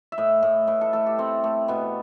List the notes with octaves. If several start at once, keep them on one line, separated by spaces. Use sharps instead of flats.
E5
A2 D#5
A2
A2 B4
A4
A3 A4
G4
A3 C4
A3
B2 B3